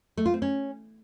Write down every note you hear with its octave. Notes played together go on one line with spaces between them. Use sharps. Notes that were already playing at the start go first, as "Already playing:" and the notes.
A3
F4
C4
C#4